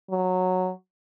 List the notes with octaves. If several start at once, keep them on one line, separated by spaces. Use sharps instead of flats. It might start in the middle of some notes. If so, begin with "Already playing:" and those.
F#3